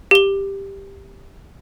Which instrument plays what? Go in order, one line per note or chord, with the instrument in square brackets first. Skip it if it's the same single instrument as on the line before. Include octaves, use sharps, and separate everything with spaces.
[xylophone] G4 G7